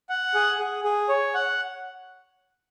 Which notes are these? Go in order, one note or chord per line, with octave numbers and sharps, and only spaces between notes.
F#5
G#4
G#4
G#4
C#5
F#5